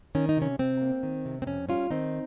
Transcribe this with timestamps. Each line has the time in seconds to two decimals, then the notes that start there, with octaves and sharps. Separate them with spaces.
0.15 D#3 C#4
0.29 D#4
0.37 C3 C#4
0.59 C3 C4
0.81 A#3
1.03 D#3
1.25 C3
1.42 C4
1.47 F2 C#4
1.69 G3 C#4 F4
1.91 D#3 C4 D#4